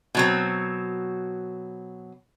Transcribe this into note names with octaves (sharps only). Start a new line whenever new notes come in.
B2 F#3 C4